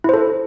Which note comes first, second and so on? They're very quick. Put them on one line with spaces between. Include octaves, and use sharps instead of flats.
E4 C5 A4